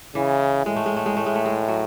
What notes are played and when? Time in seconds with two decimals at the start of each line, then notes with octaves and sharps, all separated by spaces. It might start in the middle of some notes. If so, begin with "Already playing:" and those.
0.15 C#3 E3
0.66 A2 G#3
0.76 A3
0.86 G#3
0.97 A3
1.06 G#3
1.17 A2 A3
1.26 G#3
1.35 A3
1.46 G#3
1.68 F#3